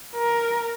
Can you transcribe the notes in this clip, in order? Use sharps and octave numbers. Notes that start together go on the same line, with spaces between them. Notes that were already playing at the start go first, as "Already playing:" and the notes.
A#4